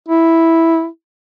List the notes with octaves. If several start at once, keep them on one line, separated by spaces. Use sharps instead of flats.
E4